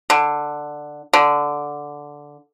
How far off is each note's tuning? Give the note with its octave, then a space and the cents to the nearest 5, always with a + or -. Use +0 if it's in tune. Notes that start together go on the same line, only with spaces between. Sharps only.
D3 +10
D3 -5